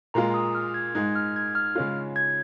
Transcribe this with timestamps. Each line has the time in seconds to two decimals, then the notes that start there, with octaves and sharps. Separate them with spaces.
0.14 A#2 G#3 F4 A#5
0.34 D#6
0.55 F6
0.74 G#6
0.95 G#2 G#3 D#4 G#6
1.15 F6
1.36 G#6
1.55 F6
1.75 C#3 G#3 C#4 F4
2.16 G#6